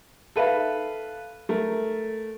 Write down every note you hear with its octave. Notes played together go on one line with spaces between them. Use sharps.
A4 B4 E5 F5
A3 A#4